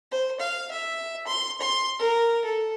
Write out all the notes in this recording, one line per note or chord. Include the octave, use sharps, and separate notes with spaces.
C5
F5
E5
C6
C6
A#4
A4